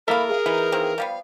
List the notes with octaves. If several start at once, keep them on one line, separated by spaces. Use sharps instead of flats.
A#3 E4 A4 A#4 E5 F5 B5
G#4
E3 B3 D#4
D#3 A#3 C4
F3 G3 B3 F5